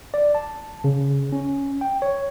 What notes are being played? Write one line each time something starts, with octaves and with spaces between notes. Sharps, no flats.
D5
A5
C#3
C#4
G5
C#5